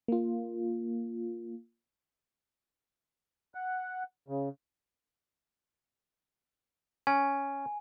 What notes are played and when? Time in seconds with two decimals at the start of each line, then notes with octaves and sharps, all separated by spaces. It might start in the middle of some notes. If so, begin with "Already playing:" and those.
0.08 A#3 F4
3.55 F#5
4.28 C#3
7.07 C#4 G#5